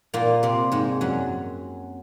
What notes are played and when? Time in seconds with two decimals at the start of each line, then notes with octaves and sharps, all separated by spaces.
0.14 A#2 A#3
0.43 C3 C4
0.72 G#2 G#3
1.01 F#2 F#3